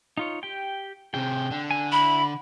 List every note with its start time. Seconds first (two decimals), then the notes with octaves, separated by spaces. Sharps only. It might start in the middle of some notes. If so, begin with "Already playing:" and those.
0.17 D#4 F4 C#5
0.43 G4 G5
1.14 C3 G#4 G5
1.51 D3
1.71 G#5
1.92 E4 B5